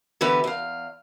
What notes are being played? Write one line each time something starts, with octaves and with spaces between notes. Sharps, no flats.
D3 E3 B3 G4 B4
E2 F5